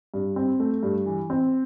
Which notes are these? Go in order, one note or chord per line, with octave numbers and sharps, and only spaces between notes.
G2
C4
A3
G2
E3
C4